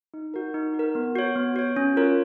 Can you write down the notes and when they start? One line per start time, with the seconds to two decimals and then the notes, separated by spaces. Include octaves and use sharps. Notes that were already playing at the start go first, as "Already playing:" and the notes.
0.14 D#4
0.34 F#4 A#4
0.54 D#4
0.74 F#4
0.79 A#4
0.95 B3
1.16 F#4 C#5
1.36 B3
1.56 F#4 C#5
1.76 C#4
1.97 F4 A#4 C#5